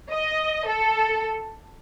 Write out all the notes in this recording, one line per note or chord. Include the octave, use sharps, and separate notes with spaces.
D#5
A4